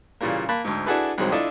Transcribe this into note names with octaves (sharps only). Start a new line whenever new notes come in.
A#2 C#3 E3 G3 A#3
A#3 A5 B5 F#6
D2 G#2
D4 E4 F#4 G#4 A4 B4
C2 D#3 F#3 G#3 C4
D4 E4 F4 A4 D#5 A5